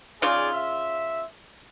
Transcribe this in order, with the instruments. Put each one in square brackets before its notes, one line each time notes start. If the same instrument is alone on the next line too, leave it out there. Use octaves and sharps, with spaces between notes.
[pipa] C#3 F4 [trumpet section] D#4 G#4 D5
[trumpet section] E5